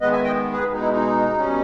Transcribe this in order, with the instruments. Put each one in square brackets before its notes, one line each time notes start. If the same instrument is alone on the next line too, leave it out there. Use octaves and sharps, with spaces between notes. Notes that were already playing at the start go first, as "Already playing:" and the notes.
[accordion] D#3 G#3 B3 B4 D#5
E5 G#5
D#5 G5
G#4 B4
B2 G#3 D#4
E4
D#4
B2 G3 C#4